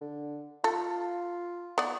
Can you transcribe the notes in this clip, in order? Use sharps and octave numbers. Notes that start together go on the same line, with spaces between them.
D3
F4 A4
B3 D5